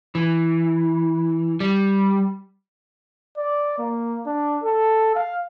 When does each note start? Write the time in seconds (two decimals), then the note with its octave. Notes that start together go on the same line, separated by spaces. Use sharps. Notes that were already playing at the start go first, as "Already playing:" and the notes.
0.15 E3
1.60 G3
3.37 D5
3.79 A#3
4.27 D4
4.63 A4
5.15 F5